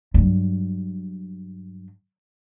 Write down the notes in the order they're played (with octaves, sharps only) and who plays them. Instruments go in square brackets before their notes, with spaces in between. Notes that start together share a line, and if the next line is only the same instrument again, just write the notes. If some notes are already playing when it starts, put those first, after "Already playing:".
[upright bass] G2 F#3